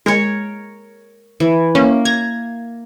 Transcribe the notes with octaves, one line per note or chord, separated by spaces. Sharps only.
G#3 A#4 C#5
E3
A#3 C#4
A#5 G#6